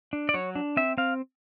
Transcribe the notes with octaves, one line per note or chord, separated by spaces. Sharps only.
D4
D5
F#3 C#5
D4
C4 E5
C4 F5